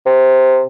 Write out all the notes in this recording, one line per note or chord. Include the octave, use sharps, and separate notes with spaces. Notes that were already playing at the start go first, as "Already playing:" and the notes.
C3